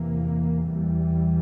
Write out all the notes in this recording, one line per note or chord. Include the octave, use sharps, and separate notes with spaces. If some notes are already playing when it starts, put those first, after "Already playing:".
Already playing: E2 C3 E3 A#3
E2 E3 G3